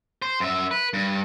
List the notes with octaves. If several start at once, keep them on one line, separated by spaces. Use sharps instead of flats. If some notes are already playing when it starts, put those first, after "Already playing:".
C5
F#2 E5
B4
G2